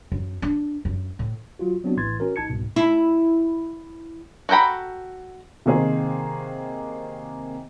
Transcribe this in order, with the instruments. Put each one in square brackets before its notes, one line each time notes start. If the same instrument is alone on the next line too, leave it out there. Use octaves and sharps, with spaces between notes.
[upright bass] F#2
D4
F#2
A2
[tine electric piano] F#3 F4 F#4
F#3 B3 C4 D4 F#4
A#1 A2 E3 C6 G#6 A6
C#4 F#4 A#4
A1 D#4 A5 G#6 C#7
C2 G#2 B2
[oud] E4
[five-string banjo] F#4 A4 G5 A#5 B5
[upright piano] C3 D#3 A#3 G#4 C5